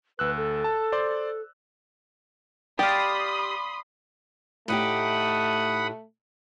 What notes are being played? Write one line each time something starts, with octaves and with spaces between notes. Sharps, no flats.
D2 B4 E6 F#6
A4
A5
C5 D5 C6
G4 D5 F5 B5 C6 D#6
A2 A3 D#4 G4 F#5 B5 D#6